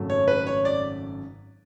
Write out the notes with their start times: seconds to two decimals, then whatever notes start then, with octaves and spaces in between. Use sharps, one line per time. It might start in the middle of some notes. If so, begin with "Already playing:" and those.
Already playing: G#1 F#2 C#3 F#3 A3
0.10 C#5
0.28 B4
0.47 C#5
0.65 D5